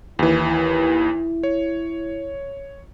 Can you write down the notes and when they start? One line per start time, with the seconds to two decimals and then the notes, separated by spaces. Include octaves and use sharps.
0.19 D#2 E3 E4
1.43 C#5